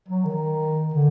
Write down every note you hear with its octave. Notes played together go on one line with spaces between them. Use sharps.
F#3
D#3
D3